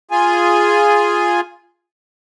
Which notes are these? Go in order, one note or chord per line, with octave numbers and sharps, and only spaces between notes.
F4 G#4 G#5